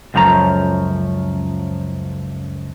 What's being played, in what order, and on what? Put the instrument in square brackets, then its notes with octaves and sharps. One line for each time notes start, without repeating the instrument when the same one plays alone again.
[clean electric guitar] C#2 F#2 F3 A3 A#5